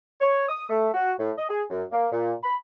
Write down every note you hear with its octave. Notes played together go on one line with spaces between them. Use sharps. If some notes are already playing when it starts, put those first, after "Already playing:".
C#5
D#6
A3
F#4
A2
D#5
G#4
F#2
A#3
A#2
B5